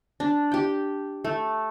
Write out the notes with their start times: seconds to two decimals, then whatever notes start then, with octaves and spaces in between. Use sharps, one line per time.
0.20 D4
0.52 G4 G5
1.25 A3